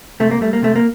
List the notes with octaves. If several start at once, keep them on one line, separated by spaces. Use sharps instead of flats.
C3 A3
A#3
G3 A3
A#3
C3 A3
A#3